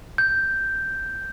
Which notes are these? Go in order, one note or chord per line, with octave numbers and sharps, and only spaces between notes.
G6